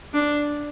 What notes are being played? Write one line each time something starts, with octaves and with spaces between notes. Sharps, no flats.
D4